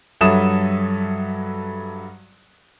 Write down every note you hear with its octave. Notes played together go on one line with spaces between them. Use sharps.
G2 F#3 A4 E5 D#6 E7